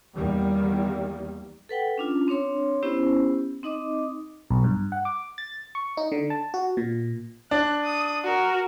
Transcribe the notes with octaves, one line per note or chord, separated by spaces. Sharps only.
E2 D#3 G3 A#3
A4 B4 F#5 G5
C#4 D4 F4
C4 D4 C#5 C6
B3 C#4 E4 G4 C5
C4 D#4 D#5 D6 D#6
B1
G2
F#5
D6
A6
C#6
D#4
D3
A5
F#4
A#2
D4 F#6
D#6
F#4 A#4